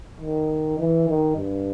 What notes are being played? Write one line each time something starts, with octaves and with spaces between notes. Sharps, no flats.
D#3
E3
D#3
G2